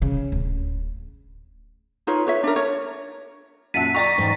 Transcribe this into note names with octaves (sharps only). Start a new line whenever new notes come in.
C#3
D1
D#4 F4 B4 C#5
B4 C#5 E5
D4 A#4
C#5
F#2 A#2 E5 F#5 A5 B6 D#7
D5 G5 A#5 C#6 A6 A#6
G#2 E3